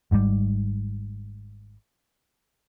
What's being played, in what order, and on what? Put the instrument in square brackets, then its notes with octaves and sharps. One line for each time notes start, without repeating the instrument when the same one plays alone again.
[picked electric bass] G#1 G#2 B2 G3